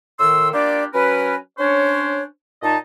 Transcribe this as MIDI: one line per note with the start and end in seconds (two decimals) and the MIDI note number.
0.19 0.48 45
0.19 0.48 51
0.19 0.48 84
0.19 0.48 88
0.53 0.83 58
0.53 0.83 62
0.53 0.83 65
0.53 0.83 67
0.53 0.83 74
0.93 1.34 54
0.93 1.34 61
0.93 1.34 70
0.93 1.34 71
1.59 2.23 61
1.59 2.23 62
1.59 2.23 72
1.59 2.23 73
2.62 2.76 46
2.62 2.76 63
2.62 2.76 75
2.62 2.76 81